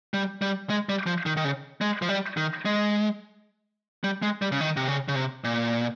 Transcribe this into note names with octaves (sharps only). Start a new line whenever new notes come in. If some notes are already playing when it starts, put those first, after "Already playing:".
G3
G3
G#3
G3
F3
D#3
D#3
C#3
G#3
F3
G3
D#3
G#3
G3
G#3
G3
C#3
D#3
C3
C#3
C#3
C3
A#2